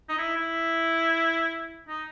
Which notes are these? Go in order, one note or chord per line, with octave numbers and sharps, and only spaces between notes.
D#4
E4
E4
D#4